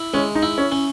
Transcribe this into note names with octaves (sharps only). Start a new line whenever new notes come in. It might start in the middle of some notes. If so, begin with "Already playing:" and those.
Already playing: E4
G#3 C#4
D#4
E4
C#4
C#4